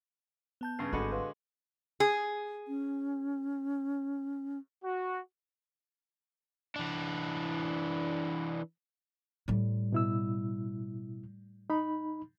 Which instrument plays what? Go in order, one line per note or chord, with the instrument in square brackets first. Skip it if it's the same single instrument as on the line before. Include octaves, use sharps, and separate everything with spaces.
[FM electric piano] B3 A5 G6
[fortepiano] G2 C#3 [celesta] C7
[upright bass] G#1 G3 [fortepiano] D3 G#3 F#4 [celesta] A4 B5 C#7
[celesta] B4 F5 C6
[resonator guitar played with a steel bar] G#4
[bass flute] C#4
[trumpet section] F#4
[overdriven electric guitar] E3 D4
[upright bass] A2 G3
[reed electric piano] B2 E4 E6
D#4 B5